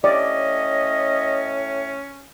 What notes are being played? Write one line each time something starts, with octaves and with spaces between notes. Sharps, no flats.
A2 C#4 D5 D#5